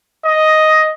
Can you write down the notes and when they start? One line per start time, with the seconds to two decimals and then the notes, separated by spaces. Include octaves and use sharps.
0.24 D#5